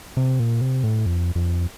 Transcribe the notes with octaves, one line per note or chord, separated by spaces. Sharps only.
C3
A#2
C3
A2
F2
F2